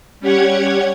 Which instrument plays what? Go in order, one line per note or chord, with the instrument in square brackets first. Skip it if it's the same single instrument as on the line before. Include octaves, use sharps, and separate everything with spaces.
[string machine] G3 C#4 G4 C#5 F#5 G#6